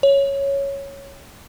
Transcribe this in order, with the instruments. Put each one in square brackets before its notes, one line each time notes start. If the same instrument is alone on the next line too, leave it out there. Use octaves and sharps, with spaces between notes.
[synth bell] C#5